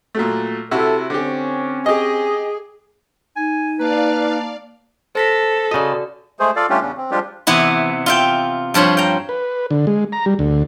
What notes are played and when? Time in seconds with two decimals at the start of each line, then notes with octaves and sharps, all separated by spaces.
0.15 A#2 F#3 A3
0.71 C3 E4 F#4 A4
1.10 D3 C4 C#4 G4
1.86 G4 G#4 D#5
3.37 D#4 G#5
3.80 A#3 B4 D5 F5 A5
5.15 A4 C5 A#6 B6
5.71 C#3 F#4 D5 D#5
6.40 G#3 A3 G#4 C5
6.56 F4 A4 D5 F5
6.70 G3 A3 C#4 D4 F4 G4
6.81 E2 C#3 C#4 D4
6.97 C4
7.11 F3 G3 G#3 D4 F4 G4
7.47 C3 E3 B3 E4
8.06 F4 E5 G5
8.74 G2 F3 C5 C#5 B5
8.97 G5 A#5
9.29 B4
9.71 D3
9.87 G#3
10.12 A#5
10.26 G3
10.39 D2